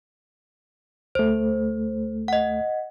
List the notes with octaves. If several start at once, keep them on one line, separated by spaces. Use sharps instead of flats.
D2 A3 C5
D#5 F#5